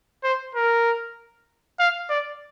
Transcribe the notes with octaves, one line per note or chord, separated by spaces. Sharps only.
C5
A#4
F5
D5